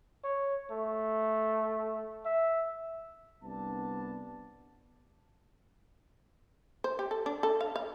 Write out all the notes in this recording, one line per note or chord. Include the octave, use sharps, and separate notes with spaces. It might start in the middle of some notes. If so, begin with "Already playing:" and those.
C#5
A3
E5
C2 B3 D4 A5
C5
G4
A4
D4
A4
F5
F5